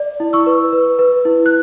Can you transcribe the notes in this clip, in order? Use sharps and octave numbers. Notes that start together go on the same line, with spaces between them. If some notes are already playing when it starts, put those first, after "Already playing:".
Already playing: D5
E4
C#6 E6
B4
B4
B4
E4
F#6